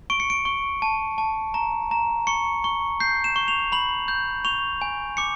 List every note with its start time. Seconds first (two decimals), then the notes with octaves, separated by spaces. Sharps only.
0.10 C#6 D7
0.20 C#7
0.30 D7
0.45 C#6
0.82 A5
1.18 A5
1.54 A#5
1.91 A#5
2.27 C#6 C#7
2.64 C#6
3.00 G6 C7
3.24 E7
3.36 C#6
3.48 F7
3.72 B5 F#7
4.08 G6
4.45 C#6 F7
4.81 G#5
5.17 D6 C#7